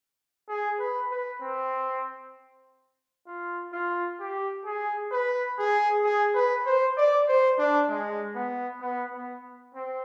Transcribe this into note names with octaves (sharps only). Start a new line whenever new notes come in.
G#4
B4
B4
C4
F4
F4
G4
G#4
B4
G#4
G#4
B4
C5
D5
C5
D4
G#3
B3
B3
B3
C4